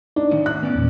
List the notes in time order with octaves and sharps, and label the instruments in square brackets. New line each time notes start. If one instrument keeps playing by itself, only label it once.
[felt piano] D4 [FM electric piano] D#4
[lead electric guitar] A2 D#3
[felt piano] F#6
[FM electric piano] B3 [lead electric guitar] C#4 D5
[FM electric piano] E2 A#2